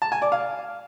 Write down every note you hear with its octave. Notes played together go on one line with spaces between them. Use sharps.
A5
G#5
D5
F5